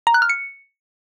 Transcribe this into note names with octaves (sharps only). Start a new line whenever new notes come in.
A#5
F#6
F6
C#7